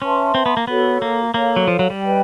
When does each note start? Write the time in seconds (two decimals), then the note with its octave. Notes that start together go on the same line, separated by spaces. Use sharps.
0.01 C#4 B4 E5 A5 C6
0.35 C4
0.46 B3
0.57 A#3
0.67 B3 F#4 A4 C#5
1.02 A#3
1.34 A#3 A4 C#5 F5
1.56 F#3
1.67 F3
1.79 F#3
1.90 G3
2.01 B4 D#5 G5